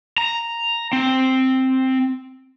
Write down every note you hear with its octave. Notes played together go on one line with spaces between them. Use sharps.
A#5
C4